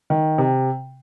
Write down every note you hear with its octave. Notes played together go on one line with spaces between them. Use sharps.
D#3
C3